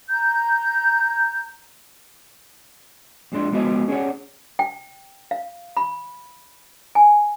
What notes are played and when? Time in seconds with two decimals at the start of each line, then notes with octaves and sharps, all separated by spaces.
0.10 A#5 G6
3.32 F2 A#2 G#3 D4 C6
3.52 F3 G#3 B3 F#4 C5 D#5
3.88 C#4 G#4 C#5 D5 F#5
4.59 G5
5.31 F5
5.77 B5
6.95 G#5